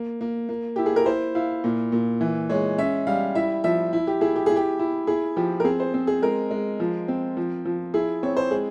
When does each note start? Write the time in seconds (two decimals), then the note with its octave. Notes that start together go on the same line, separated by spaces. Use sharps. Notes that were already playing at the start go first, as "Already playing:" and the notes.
Already playing: A#3
0.21 A#3
0.49 A#3
0.76 E4 G4
0.86 G#4
0.96 A#4
1.06 E4 C5
1.35 E4 F5
1.64 A#2
1.92 A#2
2.21 E3
2.49 G#3 C#5
2.78 C#4 E5
3.07 G3 F5
3.35 E4 E5
3.64 F3 E5
3.93 E4
4.07 G4
4.21 E4 G#4
4.36 G4
4.46 E4 G#4
4.56 G4
4.79 E4
5.07 E4 G#4
5.36 F3 G4
5.60 A#4
5.64 C4 G#4
5.80 C5
5.94 C4
6.07 G#4
6.22 G#3 A#4
6.51 G#3
6.80 F3
7.08 C4
7.37 F3
7.65 F3
7.94 E4 G#4
8.23 C4 C#5
8.37 C5
8.51 G#3 G#4